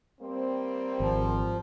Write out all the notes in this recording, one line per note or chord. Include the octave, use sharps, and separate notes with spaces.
G3 A#3 C4
G#1 F3